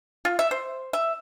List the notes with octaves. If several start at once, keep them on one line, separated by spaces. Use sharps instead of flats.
F4
E5
C5
E5